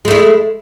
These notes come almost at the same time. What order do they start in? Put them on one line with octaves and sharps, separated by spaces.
G#3 A3 E4